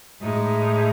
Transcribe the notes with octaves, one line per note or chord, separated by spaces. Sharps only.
A2 G#3 D#4